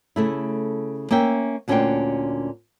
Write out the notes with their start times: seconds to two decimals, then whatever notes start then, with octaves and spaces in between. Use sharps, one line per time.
0.16 C#3 A3 E4
1.11 A#3 C#4 E5 G5
1.68 D2 A#2 C#4 D4 C5 G5